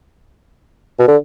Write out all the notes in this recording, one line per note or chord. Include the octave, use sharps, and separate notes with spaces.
B2
D3